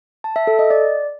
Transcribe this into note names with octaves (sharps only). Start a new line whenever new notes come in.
A5
E5
A4
D#5
D5